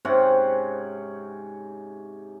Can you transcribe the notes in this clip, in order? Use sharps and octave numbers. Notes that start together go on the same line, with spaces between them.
G#2 C3 C#4 F#5